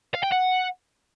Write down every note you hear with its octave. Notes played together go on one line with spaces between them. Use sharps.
F5
G5
F#5